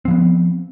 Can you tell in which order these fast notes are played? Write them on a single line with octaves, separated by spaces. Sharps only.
C4 F3 B3